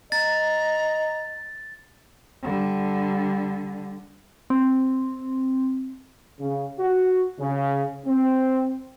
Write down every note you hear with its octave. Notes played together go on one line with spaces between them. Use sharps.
D#5 A#5 A6
D3 G3
C4
C#3
F#4
C#3
C4